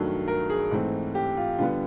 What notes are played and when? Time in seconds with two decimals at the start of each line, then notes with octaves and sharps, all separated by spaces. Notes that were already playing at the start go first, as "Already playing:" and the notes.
Already playing: G2 D#3 F#3 A3
0.28 A#4
0.50 G#4
0.71 G#2 E3 A3 C4
1.15 G4
1.37 F4
1.58 D3 G3 B3 F4